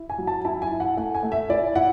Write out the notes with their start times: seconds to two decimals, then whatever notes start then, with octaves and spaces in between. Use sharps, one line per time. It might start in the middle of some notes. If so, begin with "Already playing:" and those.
Already playing: E4
0.10 G#5
0.18 F#3
0.27 A5
0.45 E4 A5
0.62 G#5
0.71 E4
0.80 F#5
0.97 A3 F#5
1.15 G#5
1.23 A3
1.32 E5
1.49 E4 D5
1.76 E4 F#5